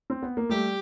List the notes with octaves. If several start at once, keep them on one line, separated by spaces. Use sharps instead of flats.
C4
B3
A#3
G3 A3 G4